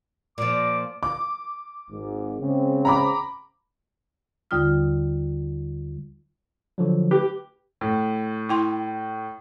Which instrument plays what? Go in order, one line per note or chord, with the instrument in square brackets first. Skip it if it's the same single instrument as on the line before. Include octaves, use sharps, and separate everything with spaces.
[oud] A#2 F3 [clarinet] D6
[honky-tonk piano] D6
[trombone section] G#1 G#2
C#3 G#3 C4
[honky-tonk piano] A#5 B5 D6
[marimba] D#2 D3 G3 F4 D#6 F6
[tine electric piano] D3 F3 F#3
[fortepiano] G4 [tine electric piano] B4
[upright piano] A2
[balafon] E4 G5 C6